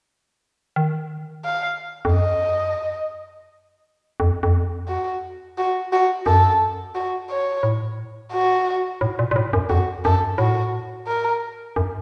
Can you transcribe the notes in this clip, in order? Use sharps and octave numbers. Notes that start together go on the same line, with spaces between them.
D#3
F5
F2
F#2 D#5
F2
F2
F#4
F#4
F#4
F#2 A4
F#4
C#5
A2
F#4
A2
A#2
A#2
A2
F#2
F2 F#4
F#2 A4
A2 F#4
A#4
F#2